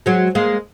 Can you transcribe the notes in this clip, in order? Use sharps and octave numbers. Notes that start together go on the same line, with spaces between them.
F#3 G#3
G#3 A#3